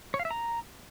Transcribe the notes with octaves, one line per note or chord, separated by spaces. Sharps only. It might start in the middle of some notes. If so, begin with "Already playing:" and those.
C#5
F5
E5
A#5